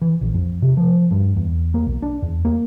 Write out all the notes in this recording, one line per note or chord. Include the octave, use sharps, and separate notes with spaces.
E3
A#1
F2
C3
F3
G2
E2
A#3
B1
D4
E2
A#3